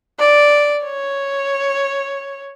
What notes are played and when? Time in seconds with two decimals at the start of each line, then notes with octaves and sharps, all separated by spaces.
0.19 D5
0.84 C#5